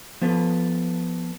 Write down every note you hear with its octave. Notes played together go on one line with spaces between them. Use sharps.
F3 B3 A4 B4